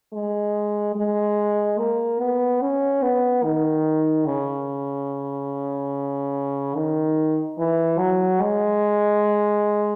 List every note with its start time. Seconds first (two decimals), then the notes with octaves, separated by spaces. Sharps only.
0.13 G#3
0.95 G#3
1.78 A#3
2.20 B3
2.61 C#4
3.02 B3
3.44 D#3
4.26 C#3
6.75 D#3
7.58 E3
7.98 F#3
8.41 G#3